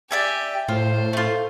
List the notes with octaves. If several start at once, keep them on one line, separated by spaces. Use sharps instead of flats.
G4 D5 E5 G5 G#5
A2 F4 C5
A3 F4